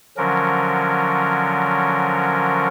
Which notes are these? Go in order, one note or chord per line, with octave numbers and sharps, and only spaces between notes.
D3 F3 F#3 C#4 A#4